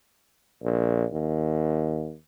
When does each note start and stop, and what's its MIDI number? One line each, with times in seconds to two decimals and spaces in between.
0.63 1.04 34
1.11 2.15 39